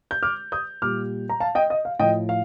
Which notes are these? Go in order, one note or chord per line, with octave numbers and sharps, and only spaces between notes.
G6
D6 F6
D#6 G6
A#2 G3 D6 F6
A#5
F5 A5
D#5 G5
D#5
F5
A2 F3 D#5 G5
F5